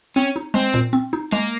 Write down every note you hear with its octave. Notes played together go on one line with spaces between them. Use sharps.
C4 C#4
D#4
G#3 C4
A#2
C4
D#4
G#3 A#3